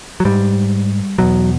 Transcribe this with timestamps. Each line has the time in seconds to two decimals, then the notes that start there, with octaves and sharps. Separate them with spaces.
0.20 F#3
0.25 G#2 G3
1.18 E2 B2 F#3